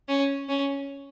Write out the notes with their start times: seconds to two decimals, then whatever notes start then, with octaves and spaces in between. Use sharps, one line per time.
0.08 C#4
0.49 C#4